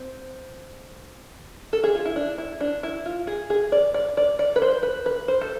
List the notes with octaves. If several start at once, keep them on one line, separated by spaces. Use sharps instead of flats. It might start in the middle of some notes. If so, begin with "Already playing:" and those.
Already playing: C4
A4
G#4
F4
E4
D4
E4
D4
E4
F4
G#4
G#4
D5
D5
D5
D5
B4
C5
B4
B4
C5
A4